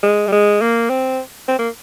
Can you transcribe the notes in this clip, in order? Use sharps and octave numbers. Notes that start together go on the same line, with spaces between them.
G#3
G3
G#3
A#3
C4
C4
A#3